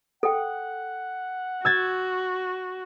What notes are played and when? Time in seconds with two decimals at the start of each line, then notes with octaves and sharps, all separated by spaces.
0.23 A4 F#5 G5
1.65 F#4 E6 G#6 A6